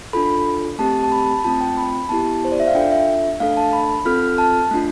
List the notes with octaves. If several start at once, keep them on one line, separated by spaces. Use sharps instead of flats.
D4 F4 A4 B5
A3 C4 G4 A5
A5
B5
A3 C4 F4 A5
G5
B5
B3 E4 G4 A5
C5
D5
E5
F5
D4 F4 A4 G5
E5
A3 D4 A4 F5
A5
B5
C4 F4 A4 F6
F6
A5
A3 D4 F4